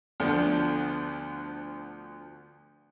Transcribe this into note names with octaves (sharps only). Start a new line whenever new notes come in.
D2 D3 F3 B3 D4